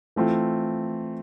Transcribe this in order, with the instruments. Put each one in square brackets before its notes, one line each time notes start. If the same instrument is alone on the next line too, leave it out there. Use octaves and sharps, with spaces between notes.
[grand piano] E3 A3 C4 F4